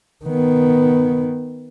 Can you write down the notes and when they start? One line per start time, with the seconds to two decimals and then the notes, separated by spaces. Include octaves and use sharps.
0.25 D#3 B3